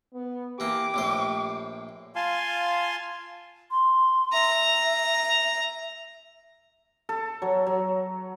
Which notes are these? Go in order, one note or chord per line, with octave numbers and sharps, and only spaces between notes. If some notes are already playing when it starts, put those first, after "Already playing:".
B3
E3 A#3 G4 D6
A#1 A2 C5
F4 F5 G#5 A5 C6
C6
E5 A#5
A4
F#3
F#3